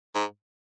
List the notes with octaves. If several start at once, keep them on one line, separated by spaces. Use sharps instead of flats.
G#2